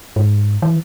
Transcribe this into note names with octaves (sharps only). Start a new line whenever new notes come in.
G#2
E3